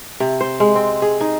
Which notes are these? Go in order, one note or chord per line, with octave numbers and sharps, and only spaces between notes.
C3
C5
G#3
C4
G#4
D#4